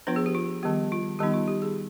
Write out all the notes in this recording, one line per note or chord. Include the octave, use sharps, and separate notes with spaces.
F3 B3 D4 F4 B4
G#4
G4
F4
D#3 G3 B3 G4
F4
D#3 G3 B3 D#4 G4
F4
G4
G#4